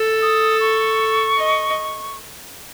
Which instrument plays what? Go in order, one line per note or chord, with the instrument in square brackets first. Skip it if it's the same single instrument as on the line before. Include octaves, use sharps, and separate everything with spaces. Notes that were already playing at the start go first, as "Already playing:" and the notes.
Already playing: [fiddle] A4
[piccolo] D#6
C#6
[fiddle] D#5